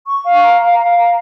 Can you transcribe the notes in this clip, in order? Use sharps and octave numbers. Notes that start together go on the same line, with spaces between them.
C#6
F5
A#5
F5
F5
A#5